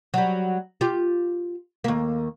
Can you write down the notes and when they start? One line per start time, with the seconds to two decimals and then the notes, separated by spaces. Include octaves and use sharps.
0.14 F#3 G3
0.81 F4 G4
1.84 D#2 A#3